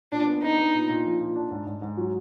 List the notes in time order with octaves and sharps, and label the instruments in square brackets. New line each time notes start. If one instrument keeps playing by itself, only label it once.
[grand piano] A#2 [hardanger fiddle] D4
[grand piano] B3
[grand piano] B3 [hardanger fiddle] D#4
[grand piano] B3
A#2
A#2
F3
A#2
D4
G#2
G#2
G#2
F#3